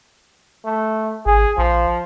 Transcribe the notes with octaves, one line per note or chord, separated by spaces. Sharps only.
A3
G#1 G#4
A#1 F3